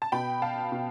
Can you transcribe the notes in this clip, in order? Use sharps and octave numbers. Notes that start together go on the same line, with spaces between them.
A5
B2 G5 B5
F5 A5
B2